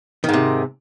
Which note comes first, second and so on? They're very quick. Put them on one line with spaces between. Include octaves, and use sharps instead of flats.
D#3 G#2 C3